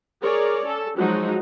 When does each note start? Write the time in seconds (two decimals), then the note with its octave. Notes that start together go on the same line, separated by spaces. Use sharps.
0.22 G#4 A#4 C#5 D5
0.65 C#4 A4
0.97 F3 F#3 G#3 D#4 F#4